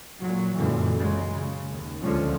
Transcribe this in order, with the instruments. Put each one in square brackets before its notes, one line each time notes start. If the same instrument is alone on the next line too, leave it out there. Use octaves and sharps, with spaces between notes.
[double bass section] A#2 F#3
F#2 A#2 D3 E3 G#3
C#3 G#3
C#3
D#2
D2 D3 F3 G#3 C#4